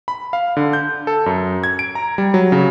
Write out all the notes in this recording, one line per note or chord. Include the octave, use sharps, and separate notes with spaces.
B5
F5
D3
G6
A4
F#2
G#6
D7
A#5
G3
F#3
C#3